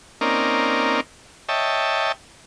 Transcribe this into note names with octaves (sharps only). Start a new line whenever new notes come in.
A#3 C4 C#4 D#4 A#4 D5
C#5 D#5 E5 G5 A5